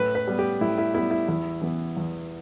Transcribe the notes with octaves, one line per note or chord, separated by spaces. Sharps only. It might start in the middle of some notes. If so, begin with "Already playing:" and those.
Already playing: A2 B4
B4
G3 B3
G4
A2 E4
E4
G3 B3 E4
E4
E2 E4
E3 B3
E2